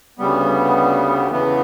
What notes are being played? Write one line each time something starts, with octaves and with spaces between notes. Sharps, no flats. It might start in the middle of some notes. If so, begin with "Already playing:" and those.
D2 C#3 G3 B3
E2 C#3 E3 B3